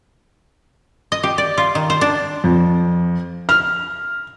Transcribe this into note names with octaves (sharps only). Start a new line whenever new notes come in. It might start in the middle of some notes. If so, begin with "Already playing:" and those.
D#5
G4
D5
F4
D#3
C5
D4
F2
F6